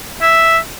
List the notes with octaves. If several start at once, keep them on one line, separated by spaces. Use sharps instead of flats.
E5